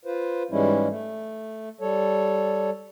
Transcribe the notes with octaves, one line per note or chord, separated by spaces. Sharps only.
F4 B4 C5
G#2 E3 G3 G#3 C#4 E4
A3
G3 A4 C#5